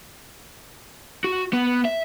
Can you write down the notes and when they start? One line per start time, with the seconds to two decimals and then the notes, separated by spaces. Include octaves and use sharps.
1.24 F#4
1.53 B3
1.85 E5